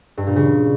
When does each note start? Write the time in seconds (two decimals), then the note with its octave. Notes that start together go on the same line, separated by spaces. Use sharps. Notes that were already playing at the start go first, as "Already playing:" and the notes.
0.17 G2
0.27 A#2
0.36 C#3